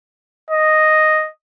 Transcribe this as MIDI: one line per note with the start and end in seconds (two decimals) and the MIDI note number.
0.51 1.29 75